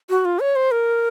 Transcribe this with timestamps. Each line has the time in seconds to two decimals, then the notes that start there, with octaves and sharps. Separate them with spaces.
0.10 F#4
0.25 F4
0.40 C#5
0.56 C5
0.71 A#4